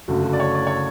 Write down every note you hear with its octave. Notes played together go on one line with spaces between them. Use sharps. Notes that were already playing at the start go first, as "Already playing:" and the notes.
F#1 F#2 D3 F#3 A3 F#4
F#4
D5
C#5
D5
C#5